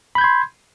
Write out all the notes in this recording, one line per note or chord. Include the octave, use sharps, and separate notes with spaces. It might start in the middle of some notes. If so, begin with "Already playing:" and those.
B5 C6 G6 G#6